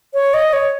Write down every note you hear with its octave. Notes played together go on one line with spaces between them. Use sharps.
C#5
D#5
C#5